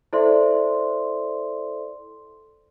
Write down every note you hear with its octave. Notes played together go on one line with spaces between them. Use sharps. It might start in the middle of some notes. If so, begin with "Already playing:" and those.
E4 A4 C5 D5 E5 C6